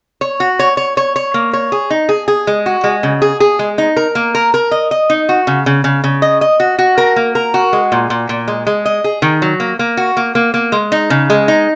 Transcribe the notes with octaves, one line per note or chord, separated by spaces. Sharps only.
C#5
F#4
C#5
C#5
C#5
C#5
A#3
C#5
G#4
D#4
G#4
G#4
G#3
F#4
G#3
C#3
G#4
G#4
G#3
D#4
A#4
A#3
A#4
A#4
D#5
D#5
D#4
F#4
C#3
C#3
C#3
C#3
D#5
D#5
F#4
F#4
A#4
A#3
A#4
F#4
G#3
A#2
A#2
A#2
G#3
G#3
D#5
G#4
D#3
F#3
A#3
A#3
F#4
A#3
A#3
A#3
G#3
D#4
C#3
G#3
D#4